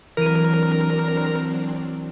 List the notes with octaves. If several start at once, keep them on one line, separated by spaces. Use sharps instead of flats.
E3 F#3 C4 D4 A#4 D#7